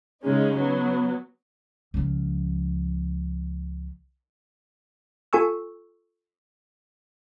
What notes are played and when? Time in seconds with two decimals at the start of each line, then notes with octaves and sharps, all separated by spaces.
0.23 C#3 G#3 C#4 D#4
0.59 F#3 B3
1.94 C#2 F3
5.33 F4 A4 G#5 C#6 E6